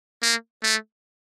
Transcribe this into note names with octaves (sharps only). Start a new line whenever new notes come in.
A#3
A3